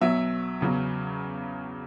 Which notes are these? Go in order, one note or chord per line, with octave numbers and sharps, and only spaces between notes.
B1 B2 F#3 E5
E2 C#3 F#3